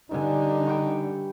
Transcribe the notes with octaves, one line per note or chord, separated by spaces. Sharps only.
G2 D3 D4 D#4 G#5
G5 B5 C#6